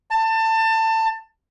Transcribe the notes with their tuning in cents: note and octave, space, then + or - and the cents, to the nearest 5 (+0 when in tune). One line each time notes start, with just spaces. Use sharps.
A5 +25